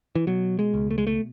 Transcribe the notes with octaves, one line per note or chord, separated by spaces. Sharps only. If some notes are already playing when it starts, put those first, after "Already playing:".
E3
B2 F#3
G#3
C#2
A3
G#3
A3